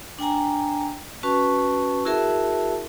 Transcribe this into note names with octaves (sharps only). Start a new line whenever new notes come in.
D4 G5 G#5 A#5
C#4 F#4 B4 A5 C#6
E4 F#4 G#4 A#4 E5 A5